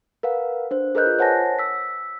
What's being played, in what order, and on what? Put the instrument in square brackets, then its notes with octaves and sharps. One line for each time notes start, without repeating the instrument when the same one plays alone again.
[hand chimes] A#4 B4 F5 F#5
D4 C5
G#4 A#4 B4 D#5 F#6 G6
F4
C5 C#5 F#5 G#5 A5 A#6
E6 B6